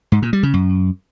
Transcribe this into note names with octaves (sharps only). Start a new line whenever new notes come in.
G#2
A#2
G3
C#3
F#2